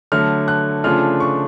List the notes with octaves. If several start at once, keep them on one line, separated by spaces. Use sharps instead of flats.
D3 F#3 A3 F6
F#6
C#3 F3 A3 D4 F4 F6
C#6